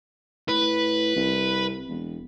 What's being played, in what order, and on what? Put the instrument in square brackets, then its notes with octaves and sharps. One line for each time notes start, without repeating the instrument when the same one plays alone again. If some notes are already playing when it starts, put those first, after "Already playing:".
[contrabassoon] A2 [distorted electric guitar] B4
[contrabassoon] C2
E1